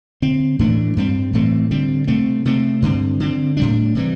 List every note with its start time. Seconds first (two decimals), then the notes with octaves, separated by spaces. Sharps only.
0.22 D3 C4
0.59 A2 E3 A3 D4
0.97 G2 G3 C4
1.33 A2 E3 A3 C4
1.71 D3 G3 C4
2.07 C3 A3 C4
2.45 C3 A3 C4
2.82 G2 D3 C4
3.20 D3 C4
3.57 A2 G3 D4
3.95 C3 E3 G3